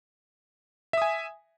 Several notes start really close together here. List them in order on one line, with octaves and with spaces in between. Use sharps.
E5 D#6 G#5